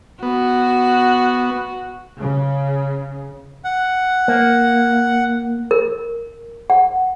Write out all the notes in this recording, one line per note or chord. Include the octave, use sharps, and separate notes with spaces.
B3 F#4
C#3
F#5
A#3
A#4
F#5